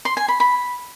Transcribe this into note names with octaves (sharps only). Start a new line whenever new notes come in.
C6
G#5
B5
B5